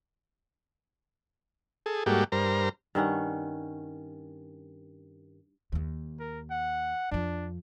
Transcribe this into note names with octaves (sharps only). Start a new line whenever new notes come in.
G#4 A4
G#2 G3 A#3 F#4 G4 A4
G2 A#4 C5 A#5
G2 D#3 C#4 F#5
D#2 A#3
A#4
F#5
F2 F3 D4